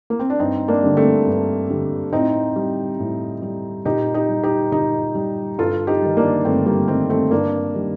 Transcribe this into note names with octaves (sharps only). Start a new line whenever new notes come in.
A#3
C4
D4
G2 C4 D#4
A#3 D4
D3 G3
A3 C4
G2
D3 G3
A2 C4 D#4
G3
A2
G3
A#2 D#4 G4
D#4 G4
G3
D#4 G4
A#2 D#4 G4
G3
G2 F4 A4
D#4 G4
D#3 G3
A#3 D4
G2 A3 C4
G3 A#3
D#3 G3 A3 C4
A3 C4
G2 A#3 D4
D#3 G3